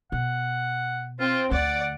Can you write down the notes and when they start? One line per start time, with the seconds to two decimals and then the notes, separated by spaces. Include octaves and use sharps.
0.12 B2 F#5
1.20 C4 F4
1.51 D2 D5 F#5